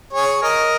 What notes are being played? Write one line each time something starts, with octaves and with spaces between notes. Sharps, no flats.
G#4 C#5
A#4 D#5